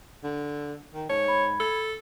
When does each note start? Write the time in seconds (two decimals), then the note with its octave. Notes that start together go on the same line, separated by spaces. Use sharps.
0.24 D3
0.94 D#3
1.09 G#2 C#5 A5
1.25 B5 G#6
1.60 A4